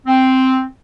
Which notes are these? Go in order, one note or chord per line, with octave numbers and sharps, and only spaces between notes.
C4